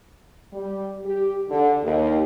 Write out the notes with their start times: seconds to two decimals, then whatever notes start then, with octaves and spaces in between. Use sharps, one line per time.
0.53 G3
1.05 G4
1.50 D3
1.83 D#2